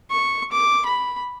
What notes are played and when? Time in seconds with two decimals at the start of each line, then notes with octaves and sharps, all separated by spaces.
0.11 C#6
0.52 D6
0.86 B5